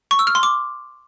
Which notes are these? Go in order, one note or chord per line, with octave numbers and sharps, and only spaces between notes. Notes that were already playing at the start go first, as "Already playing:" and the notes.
C#6
E6
F6
C6
D6